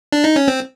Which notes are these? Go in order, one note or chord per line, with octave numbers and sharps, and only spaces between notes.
D4
D#4
C#4
C4